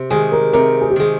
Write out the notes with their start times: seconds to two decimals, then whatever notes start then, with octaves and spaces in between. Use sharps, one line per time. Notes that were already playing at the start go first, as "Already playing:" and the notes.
Already playing: C3
0.10 D#3 G#3 G#4
0.32 A#4
0.53 C3 A#4
0.81 G#4
0.90 G4
0.96 D#3 G#3 G#4